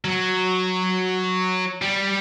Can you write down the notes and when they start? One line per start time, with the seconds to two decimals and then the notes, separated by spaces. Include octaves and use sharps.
0.05 F#3
1.82 G3